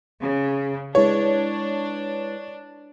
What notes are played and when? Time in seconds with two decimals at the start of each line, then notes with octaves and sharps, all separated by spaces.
0.21 C#3
0.95 G#3 D4 E4 B4 C#5